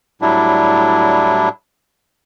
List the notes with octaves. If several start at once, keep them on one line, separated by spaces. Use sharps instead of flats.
A2 F#3 G3 D4 E4